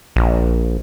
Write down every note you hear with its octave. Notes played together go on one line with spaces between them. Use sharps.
A#1